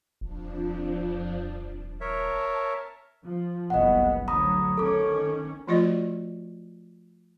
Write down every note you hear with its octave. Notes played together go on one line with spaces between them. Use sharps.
D#1 F2 F3 D4
A#4 C#5 E5 A5
F3
F#1 C2 B3 D#5 F#5
D2 D3 F#3 A#5 B5 D#6
D#3 C#4 A4 D6
F3 A3 F4 F#4 D5 D#5